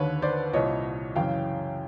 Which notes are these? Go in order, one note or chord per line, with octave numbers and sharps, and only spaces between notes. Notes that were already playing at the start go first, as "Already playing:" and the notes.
Already playing: D#2 D3 B4 C#5
C5 D5
C2 A#2 C#5 D#5
F#2 C#3 E3 F5 G5